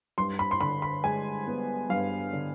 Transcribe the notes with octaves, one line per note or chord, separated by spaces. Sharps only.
G2 C6
B5
C6
D3 B5
B5
G#3 G#5
B3
G2 F5
D3